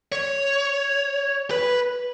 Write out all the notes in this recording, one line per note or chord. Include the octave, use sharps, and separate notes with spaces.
C#5
B4